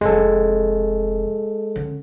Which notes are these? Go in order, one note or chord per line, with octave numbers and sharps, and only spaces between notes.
F1 G#3 A4
D3 C#4